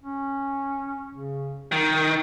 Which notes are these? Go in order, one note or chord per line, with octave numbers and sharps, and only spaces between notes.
C#4
C#3
D#3 A#4